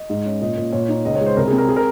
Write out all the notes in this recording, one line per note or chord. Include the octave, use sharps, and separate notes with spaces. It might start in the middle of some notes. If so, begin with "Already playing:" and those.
Already playing: D#5
G#2
C#4
A#2 D#5
A#2
A#2 C#5
D#4
C#2 D#5
C#5
G#3
C5
C2 A#4
G#4
C4
A#4
G#4
A#4